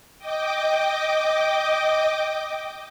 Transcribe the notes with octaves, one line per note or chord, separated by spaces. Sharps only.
D#5 G5 D6